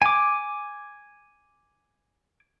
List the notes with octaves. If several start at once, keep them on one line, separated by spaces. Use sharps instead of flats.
G#5 D6